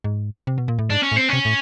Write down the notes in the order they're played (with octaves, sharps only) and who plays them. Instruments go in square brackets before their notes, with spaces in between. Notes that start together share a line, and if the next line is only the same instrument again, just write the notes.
[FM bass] G#2
C3
B2
A#2
A2
[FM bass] G#2 [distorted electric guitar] D4
[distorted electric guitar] C#4
[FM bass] A2
[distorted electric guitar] C4
[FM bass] C3 [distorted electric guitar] C#4
[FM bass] A2